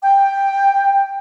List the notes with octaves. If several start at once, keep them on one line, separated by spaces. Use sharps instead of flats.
G5